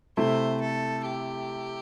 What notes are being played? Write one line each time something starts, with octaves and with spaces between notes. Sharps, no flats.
C3 A3 E4 C5
A4
G4